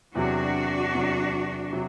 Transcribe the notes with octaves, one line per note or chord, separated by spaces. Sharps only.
E2 C3 F#3 D4 F#4
E2 C3 F#3
C3 F#3